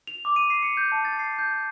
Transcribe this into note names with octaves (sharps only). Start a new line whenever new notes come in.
F7
D6
D#7
C7
C#7
G6
A5
A6
C7
G6
G6